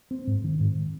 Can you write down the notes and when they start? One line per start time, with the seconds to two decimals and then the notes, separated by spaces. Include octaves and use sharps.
0.11 C4
0.27 G#2
0.44 D#3
0.60 G#2